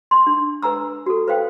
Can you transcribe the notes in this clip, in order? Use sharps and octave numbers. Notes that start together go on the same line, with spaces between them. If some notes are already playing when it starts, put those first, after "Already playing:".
C6
D4
B4 G#5 A#5 E6
F#4 A4
B4 C5 F5 G5